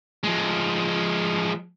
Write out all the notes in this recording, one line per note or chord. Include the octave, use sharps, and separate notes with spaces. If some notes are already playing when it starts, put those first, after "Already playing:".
F3 G#3